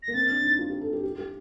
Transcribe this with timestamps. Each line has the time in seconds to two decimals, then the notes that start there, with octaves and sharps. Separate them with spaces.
0.03 A#6
0.08 A#3
0.13 C4 A6
0.29 D4
0.44 D#4
0.59 F4
0.70 G4
0.81 A4
0.93 G4
1.03 G4
1.18 G4